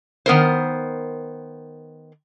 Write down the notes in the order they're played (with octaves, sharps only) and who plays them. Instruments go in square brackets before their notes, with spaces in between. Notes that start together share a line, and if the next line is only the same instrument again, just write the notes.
[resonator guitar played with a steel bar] D#3 B3 A#4 C5